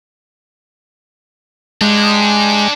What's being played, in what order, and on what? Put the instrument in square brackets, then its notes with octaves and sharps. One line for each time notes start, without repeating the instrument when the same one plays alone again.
[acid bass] G#3 [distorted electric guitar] D4 G4